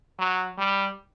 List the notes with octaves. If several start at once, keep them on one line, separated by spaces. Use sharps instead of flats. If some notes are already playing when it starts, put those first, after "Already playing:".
F#3
G3